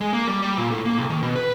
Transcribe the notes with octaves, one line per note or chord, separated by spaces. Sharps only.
G#3
A#3
G3
G3
A#2
A2
A#3
C2
D#3
B2
B4